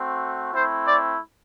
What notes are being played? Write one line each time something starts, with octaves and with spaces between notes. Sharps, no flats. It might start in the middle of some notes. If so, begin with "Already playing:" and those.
Already playing: A3 C4 F#4
A3 C4 E4 C5
D5